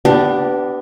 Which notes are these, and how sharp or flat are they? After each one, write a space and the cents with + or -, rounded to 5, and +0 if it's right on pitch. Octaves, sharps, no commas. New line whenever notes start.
B3 +20 D4 +0 G4 -20